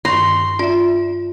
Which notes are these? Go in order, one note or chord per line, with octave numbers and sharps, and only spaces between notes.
G2 D#3 C6 C#6
F4 D5 E5